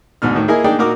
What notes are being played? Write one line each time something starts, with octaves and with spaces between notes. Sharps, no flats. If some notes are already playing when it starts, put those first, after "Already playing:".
D2 G#2 B2 F6
A2 D#3
A#3 E4 G#4 A#4 D#5 G#5
A#3 D4 D#4 G#4 D5 G5
A#2 D#4 F#4 A#4 D6